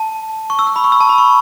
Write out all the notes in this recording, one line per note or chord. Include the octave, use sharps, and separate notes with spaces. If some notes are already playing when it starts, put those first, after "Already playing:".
Already playing: A5
C#6
E6
C#6
B5
C#6
E6
A5
B5
C#6